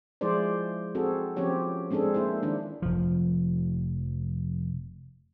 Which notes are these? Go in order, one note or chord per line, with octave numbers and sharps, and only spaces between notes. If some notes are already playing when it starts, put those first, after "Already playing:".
F3 G#3 E4 G#4 C5 D5
C4 F#4 G#4 A4
F3 C4 C#4 G4 C#5
G#3 C4 D4 G#4 A4
A#3 E4 C5
D#3 G#3 D4
F1 F3